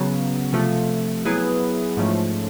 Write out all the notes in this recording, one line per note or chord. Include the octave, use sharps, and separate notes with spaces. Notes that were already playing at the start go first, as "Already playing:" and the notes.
Already playing: C#3 F#3 B3
C3 F3 A3
F#3 B3 E4 G#4 B4
G#2 F3 A3 C#4